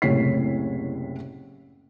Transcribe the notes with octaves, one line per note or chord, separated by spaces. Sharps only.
F#1 C2 A2 C#5 B6 C7